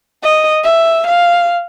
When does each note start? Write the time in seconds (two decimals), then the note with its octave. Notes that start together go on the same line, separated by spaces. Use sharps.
0.23 D#5
0.64 E5
1.07 F5